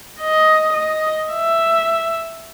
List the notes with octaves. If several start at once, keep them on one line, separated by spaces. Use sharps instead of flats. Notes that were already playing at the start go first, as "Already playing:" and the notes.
D#5
D#5
E5